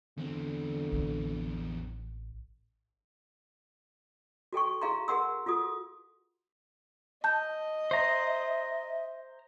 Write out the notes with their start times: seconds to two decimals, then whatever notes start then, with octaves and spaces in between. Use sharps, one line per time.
0.17 E2 D3 C4
0.92 A1
4.53 F#4 A4 G5 C#6
4.81 E4 G#4 F5 A#5 C6
5.08 G#4 A#4 F#5 C6 E6
5.46 F4 F#4 A4 D#6
7.24 D#5 A5 G6
7.91 C5 E5 A#5